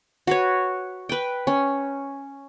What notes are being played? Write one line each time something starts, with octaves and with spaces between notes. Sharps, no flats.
F#4 B4 C#5
B4 G5
C#4